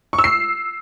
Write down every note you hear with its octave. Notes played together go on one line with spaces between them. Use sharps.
C#6
E6
C7